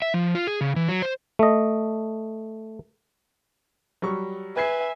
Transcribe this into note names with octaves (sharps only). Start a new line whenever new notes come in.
E5
F3
F4
G#4
C#3
E3
F#3
C5
A3 D#5
F#3 G3 C#6
B4 E5 G#5 B5 G#6 C7